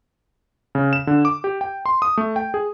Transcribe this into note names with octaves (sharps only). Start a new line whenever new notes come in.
C#3
E7
D3
D6
G4
G5
C6
D#6
A3
G5
G#4